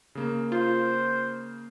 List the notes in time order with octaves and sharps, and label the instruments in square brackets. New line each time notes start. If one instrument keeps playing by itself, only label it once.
[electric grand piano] C#3 A#3
[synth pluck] F4 [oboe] C5